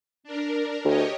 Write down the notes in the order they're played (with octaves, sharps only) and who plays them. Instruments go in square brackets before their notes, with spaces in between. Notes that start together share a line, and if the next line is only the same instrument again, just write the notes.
[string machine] D4 A#4
[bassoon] D2 [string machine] G4 C#5 D#5